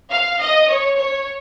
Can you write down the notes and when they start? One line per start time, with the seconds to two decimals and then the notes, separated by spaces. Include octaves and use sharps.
0.10 F5
0.40 D#5
0.68 C#5
0.96 C#5